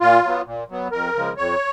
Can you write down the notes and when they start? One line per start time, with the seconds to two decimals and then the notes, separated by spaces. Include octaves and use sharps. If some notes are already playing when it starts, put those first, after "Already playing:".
0.01 A#2 F4
0.24 F#3 B3
0.46 A#2
0.70 F#3 B3
0.92 F2 A#4
1.15 C#3 F3 G#3
1.37 F2 C#5